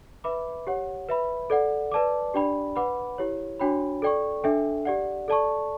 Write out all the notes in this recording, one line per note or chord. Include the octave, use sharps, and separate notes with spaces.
B4 E5 B5 D6
G4 C#5 F#5
B4 E5 B5
A4 D5 F#5
B4 D5 A5 D6
D4 G4 D5 G5 B5
B4 F#5 B5 D6
E4 G4 C#5
D4 F#4 C#5 G5 B5
A4 D5 G5 C#6
D4 A4 E5 G5
G4 D5 F#5
A4 D5 A5 C#6